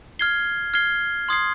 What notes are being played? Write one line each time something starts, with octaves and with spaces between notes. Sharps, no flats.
F6 G#6 C7 G7
F6 G#6 C7 G7
C6 D#6 G#6 C7